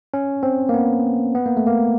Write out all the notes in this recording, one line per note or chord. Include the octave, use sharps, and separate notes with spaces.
C#4
C4
A#3
B3
B3
A#3
A3
A#3